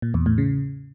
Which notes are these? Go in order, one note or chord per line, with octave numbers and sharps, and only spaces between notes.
A#2
E2
A2
C#3